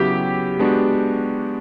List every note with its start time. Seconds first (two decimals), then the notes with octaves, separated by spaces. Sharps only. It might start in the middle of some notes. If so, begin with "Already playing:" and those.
Already playing: C#3 F#3 B3 E4 G4
0.59 G#3 B3 D4 F#4